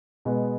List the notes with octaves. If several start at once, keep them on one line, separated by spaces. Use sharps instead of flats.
B2 G#3 B3